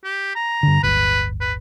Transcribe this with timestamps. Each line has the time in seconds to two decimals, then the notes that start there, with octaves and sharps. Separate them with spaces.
0.04 G4
0.35 A#5
0.63 G2 D3
0.83 D1 G1 B4
1.41 B4